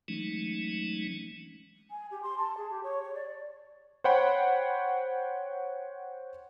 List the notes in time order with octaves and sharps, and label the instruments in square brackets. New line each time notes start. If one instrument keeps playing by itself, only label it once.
[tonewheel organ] E3 F#3 G#3 A3 C#4 D#4
[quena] G#5
G4
C6
A5
G#4
G4
C#5
C#5
D5
[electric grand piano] C5 C#5 F#5 G5 B5